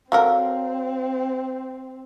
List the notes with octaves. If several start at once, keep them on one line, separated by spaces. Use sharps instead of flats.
F#3 C4 A4 A#4 F5